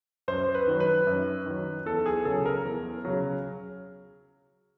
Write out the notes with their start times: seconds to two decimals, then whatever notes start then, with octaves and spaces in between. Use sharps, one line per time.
0.28 F#2 C5
0.55 B4
0.67 D#3 F#3
0.80 B4
1.07 F#2
1.46 D#3 F#3
1.86 E2 A4
2.06 G#4
2.25 C#3 F#3 A4
2.46 A#4
2.65 E2
3.05 C#3 F#3